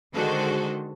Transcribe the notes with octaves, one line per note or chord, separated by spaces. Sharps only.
D3 D#3 G#3 F#4 A4 C5